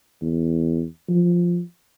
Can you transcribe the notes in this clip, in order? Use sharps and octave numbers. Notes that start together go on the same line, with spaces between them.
E2
F3